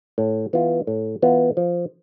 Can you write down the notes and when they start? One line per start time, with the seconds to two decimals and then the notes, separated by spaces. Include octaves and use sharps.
0.18 A2
0.53 E3 B3 F4
0.87 A2
1.22 E3 B3 F4
1.57 F3